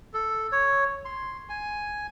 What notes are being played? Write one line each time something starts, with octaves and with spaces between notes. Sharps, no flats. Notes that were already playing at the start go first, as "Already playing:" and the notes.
A4
C#5
C6
G#5